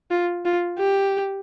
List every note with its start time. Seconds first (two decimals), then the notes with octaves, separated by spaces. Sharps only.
0.11 F4
0.45 F4
0.79 G4